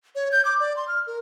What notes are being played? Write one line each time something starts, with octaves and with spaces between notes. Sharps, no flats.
C#5
G6
D6
D5
C6
F6
A#4